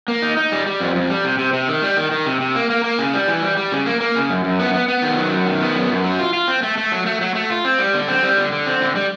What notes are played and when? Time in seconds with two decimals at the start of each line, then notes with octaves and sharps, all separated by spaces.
0.08 A#3
0.22 D#4
0.37 D#4
0.52 G3
0.66 G3
0.80 F2
0.95 F2
1.10 G3
1.24 C3
1.39 C3
1.53 C3
1.68 D#3
1.82 G3
1.97 D#3
2.11 D#3
2.26 C3
2.41 C3
2.55 A#3
2.70 A#3
2.84 A#3
2.99 C#3
3.13 G3
3.28 E3
3.43 G3
3.57 G3
3.72 C#3
3.86 A#3
4.00 A#3
4.15 C#3
4.30 F#2
4.44 F#2
4.59 B3
4.74 B3
4.88 B3
5.02 D#3
5.17 F#3
5.31 F#2
5.46 D#3
5.61 B3
5.75 F#2
5.90 F#2
6.04 F#3
6.19 F4
6.33 F4
6.48 C4
6.63 A3
6.78 A3
6.92 F#3
7.06 A3
7.21 F#3
7.35 A3
7.50 F4
7.65 C4
7.79 G3
7.94 D3
8.08 C4
8.23 G3
8.37 D3
8.52 D3
8.66 C4
8.81 D3
8.96 G3